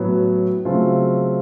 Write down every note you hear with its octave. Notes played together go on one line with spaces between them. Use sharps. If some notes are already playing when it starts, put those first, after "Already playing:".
Already playing: A2 F#3 B3
C#3 F#3 A3 C4 F4